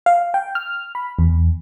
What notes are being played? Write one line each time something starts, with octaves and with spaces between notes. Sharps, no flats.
F5
G5
F6
B5
E2